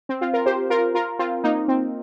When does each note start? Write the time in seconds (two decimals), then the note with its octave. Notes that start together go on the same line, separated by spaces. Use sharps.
0.09 C4
0.21 C4 F4
0.33 F4 A#4
0.46 G4 C5
0.70 F4 A#4
0.95 F4 A#4
1.19 C4 F4
1.43 A#3 D#4
1.68 C4